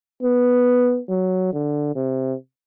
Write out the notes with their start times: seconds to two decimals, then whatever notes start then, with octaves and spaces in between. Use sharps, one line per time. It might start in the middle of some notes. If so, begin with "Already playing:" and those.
0.23 B3
1.09 F#3
1.53 D3
1.95 C3